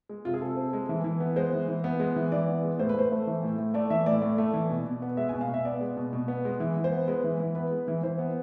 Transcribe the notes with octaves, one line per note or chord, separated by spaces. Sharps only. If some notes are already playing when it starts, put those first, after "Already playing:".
G#3
C3 F4
G#4
C3 A4
C4
G#3
E3
E3
B3
G#3 C5
E3
E3
B3
G#3
E3
E3 D5
B3
G#3
A2 C5
B4
A2 C5
A3
E3
A2
A2
A3 D5
E3 E5
A2 D5
A2
A3
E3
B2
B2
B3
G#3 E5
B2 G#5
F5
B2 E5
B3 D5
G#3
B2
B2
B3
G#3
E3
E3
C5
B3
G#3 B4
E3
E3
B3 B4
G#3
E3
E3 C5
B3